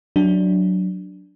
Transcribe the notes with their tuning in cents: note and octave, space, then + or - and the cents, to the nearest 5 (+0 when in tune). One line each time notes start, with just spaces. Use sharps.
F#3 +0 D4 +0